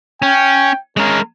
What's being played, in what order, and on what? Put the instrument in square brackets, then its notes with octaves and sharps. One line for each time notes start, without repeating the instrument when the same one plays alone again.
[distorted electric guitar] C#4 [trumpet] G5
[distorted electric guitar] G#3 A#4 [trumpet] C#4